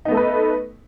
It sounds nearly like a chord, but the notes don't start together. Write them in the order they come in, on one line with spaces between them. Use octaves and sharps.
D#4 B3 A3 A4 B4